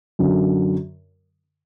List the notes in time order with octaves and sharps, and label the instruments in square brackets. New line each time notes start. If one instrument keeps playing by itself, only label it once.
[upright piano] F#2 D3 F#3